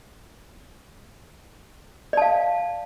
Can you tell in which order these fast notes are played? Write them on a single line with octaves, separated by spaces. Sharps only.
D5 A5 F5